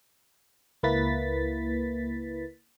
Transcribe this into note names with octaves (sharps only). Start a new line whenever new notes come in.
C#2 A#3 E4 B4 A6 B6